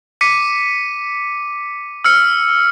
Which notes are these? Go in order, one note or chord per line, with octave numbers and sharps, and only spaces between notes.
D6 B6 C#7 D#7
E6 F6 C#7